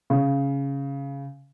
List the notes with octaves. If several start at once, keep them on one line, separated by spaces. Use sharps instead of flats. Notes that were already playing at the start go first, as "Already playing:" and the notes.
C#3